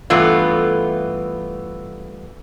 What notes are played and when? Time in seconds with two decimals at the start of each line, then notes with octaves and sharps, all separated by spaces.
0.10 G2 E3 A3 B3 F4